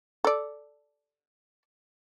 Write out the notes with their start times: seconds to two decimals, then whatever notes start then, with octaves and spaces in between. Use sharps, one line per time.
0.24 A4 D5